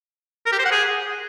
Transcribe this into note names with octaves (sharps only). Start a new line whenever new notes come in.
A#4
G4
C5
F#5
G#4